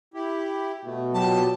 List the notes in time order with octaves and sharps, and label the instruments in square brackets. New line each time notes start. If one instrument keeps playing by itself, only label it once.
[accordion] E4 G4
[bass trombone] B2 [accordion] A3
[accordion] A#2 B3 G4 [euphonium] F#3 [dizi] A5